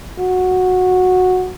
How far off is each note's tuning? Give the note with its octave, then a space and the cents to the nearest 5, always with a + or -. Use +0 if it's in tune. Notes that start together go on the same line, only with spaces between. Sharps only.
F#4 -10